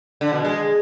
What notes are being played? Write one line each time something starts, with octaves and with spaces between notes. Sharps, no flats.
D3
B2
G#3